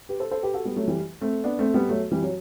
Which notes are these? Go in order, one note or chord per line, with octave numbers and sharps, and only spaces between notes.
G4 B4
A4 C5
A4 C5
G4 B4
F#4 A4
G3 B3
F#3 A3
E3 G3
A3 C4
B3 D4
A3 C4
G3 B3
F#3 A3
E3 G3
F#3